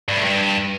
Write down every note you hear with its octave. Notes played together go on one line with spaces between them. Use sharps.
G2
A2
G2